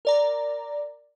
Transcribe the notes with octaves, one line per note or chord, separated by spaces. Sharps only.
A#4 D5 A#5